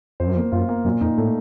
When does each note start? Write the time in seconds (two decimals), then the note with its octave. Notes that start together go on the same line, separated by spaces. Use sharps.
0.20 F2 C5
0.27 F#2
0.35 F2 A#3
0.52 F#2 F4
0.69 A#3
0.85 F#2 A#2
1.01 F2 D#4
1.17 A2 A3